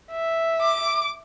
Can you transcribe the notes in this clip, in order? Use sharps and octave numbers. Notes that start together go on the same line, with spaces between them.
E5
D6